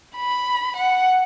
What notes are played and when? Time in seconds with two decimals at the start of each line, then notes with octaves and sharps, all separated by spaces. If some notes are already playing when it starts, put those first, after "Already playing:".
0.17 B5
0.76 F#5